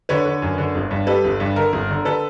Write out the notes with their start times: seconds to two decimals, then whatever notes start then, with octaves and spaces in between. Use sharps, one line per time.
0.09 D3 B4 C#5
0.25 D3
0.42 F#2
0.58 D3
0.75 G1
0.91 G2
1.07 G3 A4 B4
1.24 G1
1.40 G2
1.56 D3 A#4
1.73 G1
1.90 D3
2.05 D3 A4 B4